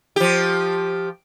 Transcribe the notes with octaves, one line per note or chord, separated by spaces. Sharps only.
F3 G4